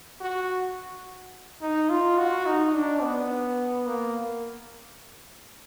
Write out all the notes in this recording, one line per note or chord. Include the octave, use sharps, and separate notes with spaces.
F#4
D#4
F4
F#4
D#4
D4
B3
A#3